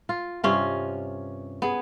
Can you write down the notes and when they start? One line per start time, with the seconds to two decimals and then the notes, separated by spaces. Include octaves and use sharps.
0.09 F4
0.44 G2 C3 C#4 F4
1.62 B3 G#4